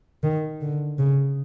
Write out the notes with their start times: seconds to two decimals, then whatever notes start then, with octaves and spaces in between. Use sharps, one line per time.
0.23 D#3
0.61 D3
0.99 C#3